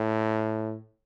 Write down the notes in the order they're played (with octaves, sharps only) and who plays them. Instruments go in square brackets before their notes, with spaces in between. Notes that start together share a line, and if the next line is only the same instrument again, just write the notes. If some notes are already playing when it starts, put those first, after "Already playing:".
Already playing: [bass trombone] A2